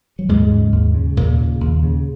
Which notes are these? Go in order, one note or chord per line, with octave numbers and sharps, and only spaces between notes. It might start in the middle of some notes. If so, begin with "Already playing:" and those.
F#3
D#2 G#2 G#3
C#3
D#2
C#3
D#2 A#2 A#3
C#3
D#2
C#3